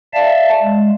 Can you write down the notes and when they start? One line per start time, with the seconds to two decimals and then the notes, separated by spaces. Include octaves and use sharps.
0.14 D5 E5 F5 A5
0.62 G#3